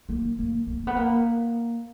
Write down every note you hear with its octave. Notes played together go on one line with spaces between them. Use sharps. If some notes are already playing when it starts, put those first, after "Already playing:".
A#3
A#3
A#3
B3
A#3